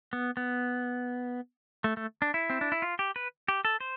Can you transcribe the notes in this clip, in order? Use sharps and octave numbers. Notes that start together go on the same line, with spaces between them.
B3
B3
A3
A3
D4
E4
C4
D4
E4
F4
G4
B4
G4
A4
C5